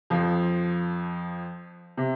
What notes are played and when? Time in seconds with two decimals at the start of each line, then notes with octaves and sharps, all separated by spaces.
0.10 F2 F3
1.97 C3